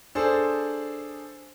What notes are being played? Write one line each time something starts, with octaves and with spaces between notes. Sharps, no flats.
D4 G#4 A4 C5